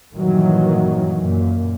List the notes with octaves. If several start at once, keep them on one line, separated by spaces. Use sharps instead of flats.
G2 A#2 D#3 E3 F#3
F#2 A#2